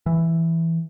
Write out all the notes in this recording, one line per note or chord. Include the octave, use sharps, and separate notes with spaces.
E3